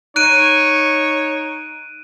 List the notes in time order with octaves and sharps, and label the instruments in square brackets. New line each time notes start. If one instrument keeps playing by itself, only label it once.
[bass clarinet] D#4 [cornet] C#5 [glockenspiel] F#6 D7 D#7